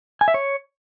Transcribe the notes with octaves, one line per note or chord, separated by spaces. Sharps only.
G#5
E5
C#5